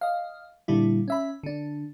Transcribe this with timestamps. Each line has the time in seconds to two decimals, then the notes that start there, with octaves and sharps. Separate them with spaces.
0.01 D#5 F5
0.68 A#2 D3 G3 E4
1.08 C#4 E5 B5
1.43 D3 D4